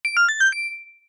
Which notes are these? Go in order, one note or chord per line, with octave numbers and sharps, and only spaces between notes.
D7
F6
A6
G6
D7